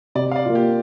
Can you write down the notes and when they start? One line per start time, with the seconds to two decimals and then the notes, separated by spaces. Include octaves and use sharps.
0.15 C3 D5
0.32 F5
0.36 D5
0.46 A#3 F4
0.55 G4